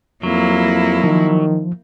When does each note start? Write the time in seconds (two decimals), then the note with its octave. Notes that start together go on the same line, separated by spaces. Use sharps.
0.23 F2 F#3 A#3 E4
1.04 D#3 F3